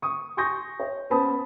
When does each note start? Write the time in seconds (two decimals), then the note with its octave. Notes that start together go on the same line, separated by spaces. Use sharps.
0.02 C#6 D#6
0.37 G#5 C6 C#6 D#6 G6 A#6
0.80 C#5
1.10 B3 C#4 C5 A5 B5 D#6